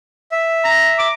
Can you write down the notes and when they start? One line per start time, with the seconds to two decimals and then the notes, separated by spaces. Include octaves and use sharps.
0.32 E5
0.65 A#5
0.99 D6